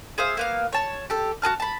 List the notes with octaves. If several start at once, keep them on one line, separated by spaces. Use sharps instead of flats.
G#4 C5 E5 F5
A#3 B3 F5
C#5 A5
G4 A4
F#4 G#4 A5 F6
A5 B5